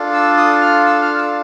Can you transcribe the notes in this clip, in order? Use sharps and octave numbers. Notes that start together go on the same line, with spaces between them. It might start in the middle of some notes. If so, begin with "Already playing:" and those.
Already playing: D4 F4 A4
E6
D#6
F6
E6
F6
E6